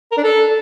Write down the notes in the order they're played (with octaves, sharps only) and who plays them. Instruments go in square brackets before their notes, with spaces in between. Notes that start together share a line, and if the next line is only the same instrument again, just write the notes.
[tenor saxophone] A#4
D4
A4